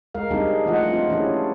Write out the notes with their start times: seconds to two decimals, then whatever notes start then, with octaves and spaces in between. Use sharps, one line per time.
0.15 G#3 A#4 F5
0.31 G3 C4 D4 D#4 G4 G#4
0.48 G#4
0.66 E3 F3 A3 F4 D#5 F#5
0.90 C4 D4 F4
1.09 E3 C#4 D4 E4 G4 G#4